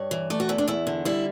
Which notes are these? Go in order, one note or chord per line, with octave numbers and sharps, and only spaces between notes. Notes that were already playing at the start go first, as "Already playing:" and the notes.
Already playing: G2 C#5
E3
A3 D5
F#4
E2 E4
D4
E2 E4
D3
G3 E4